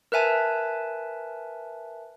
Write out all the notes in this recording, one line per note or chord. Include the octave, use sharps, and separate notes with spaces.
A#4 B4 E5 G#5 A5